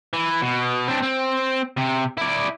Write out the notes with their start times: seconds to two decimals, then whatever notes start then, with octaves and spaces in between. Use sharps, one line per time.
0.13 E3
0.42 B2
0.88 C4 D4
1.03 C4
1.77 C3
2.17 E4 D5